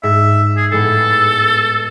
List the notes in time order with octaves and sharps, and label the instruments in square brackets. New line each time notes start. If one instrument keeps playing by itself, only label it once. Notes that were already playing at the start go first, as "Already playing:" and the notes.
[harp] G#2 [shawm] E5
[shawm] G#4
[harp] A2 G#3 B3 [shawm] A4